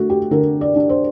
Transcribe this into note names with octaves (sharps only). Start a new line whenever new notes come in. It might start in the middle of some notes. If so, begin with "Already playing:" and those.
Already playing: D3 A3 F#4
G4
D3 A#4
D5
D4
C5